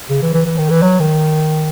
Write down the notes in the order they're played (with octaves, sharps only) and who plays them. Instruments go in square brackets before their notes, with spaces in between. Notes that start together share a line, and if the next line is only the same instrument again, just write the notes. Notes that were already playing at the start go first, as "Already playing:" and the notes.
[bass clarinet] C#3
E3
E3
E3
D#3
E3
F#3
D#3